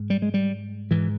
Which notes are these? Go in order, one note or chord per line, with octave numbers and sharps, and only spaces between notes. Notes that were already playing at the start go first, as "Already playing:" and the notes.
Already playing: G#2
G3
G#3
G3
G#2 E3